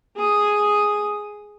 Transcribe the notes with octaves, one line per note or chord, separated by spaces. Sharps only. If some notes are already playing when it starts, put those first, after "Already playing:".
G#4 D#6